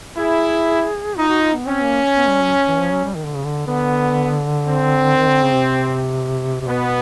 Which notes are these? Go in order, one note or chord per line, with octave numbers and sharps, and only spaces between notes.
E4 G#4
D#4 F4
F#4
F4
B3
C4 C#4
A#3
B3
G3
F#3
E3
F3
F#3
G3
D#3
D3
C#3
D3
D3 B3
C4
D#3
D3
C#3
C3
C3
B2 B3